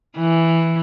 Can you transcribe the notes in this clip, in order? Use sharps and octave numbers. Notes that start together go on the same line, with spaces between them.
E3